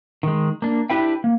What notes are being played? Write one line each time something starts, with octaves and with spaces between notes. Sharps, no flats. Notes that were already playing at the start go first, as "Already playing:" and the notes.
D#3 G#3
A#3 D4
D4 E4 G4 B4 E5 G5
A#3